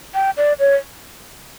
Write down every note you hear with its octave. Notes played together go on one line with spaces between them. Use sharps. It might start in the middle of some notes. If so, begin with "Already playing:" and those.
G5
D5
C#5